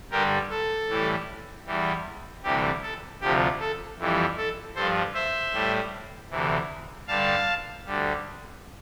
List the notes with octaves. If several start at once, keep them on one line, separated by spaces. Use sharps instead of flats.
G2 D3 G3 G4 A#4
A4
A2 E3 G3
E2 E3 G3
D2 C3 E3 G3 G4
A4
D2 C3 F3 G4
A4
F2 E3 G3
A4
G2 F3 A4 C5
C5 E5
A2 G3
D2 C3 E3
G2 D3 G3 F5 A5
D2 D3 G3